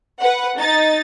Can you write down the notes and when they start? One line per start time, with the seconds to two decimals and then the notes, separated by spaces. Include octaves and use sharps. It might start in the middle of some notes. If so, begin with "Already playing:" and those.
0.20 B4 F#5
0.58 D#4 A6